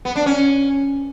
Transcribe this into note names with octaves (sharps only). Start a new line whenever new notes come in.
B3
D4
C#4